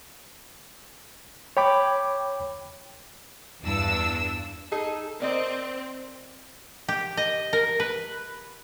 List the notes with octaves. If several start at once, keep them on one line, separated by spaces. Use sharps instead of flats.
C#5 G5 B5 D6
E2 G2 D4 E6
D#4 G#4 A4
C4 A#4 D5 D#5
G4
D#5
A#4
B4